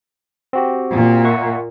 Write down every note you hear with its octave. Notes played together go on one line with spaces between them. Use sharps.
C4 F#4 G4
A#2
E5 F#5 C#6